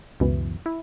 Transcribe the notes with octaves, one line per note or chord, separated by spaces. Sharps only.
C#2 F#2 B2 E3
E4